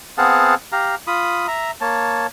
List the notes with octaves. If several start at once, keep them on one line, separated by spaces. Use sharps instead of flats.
B3 C4 G#4 F5 F#5 A5
G4 F5 A#5
F4 B5 D#6
E5 A#5
A#3 C#5 A5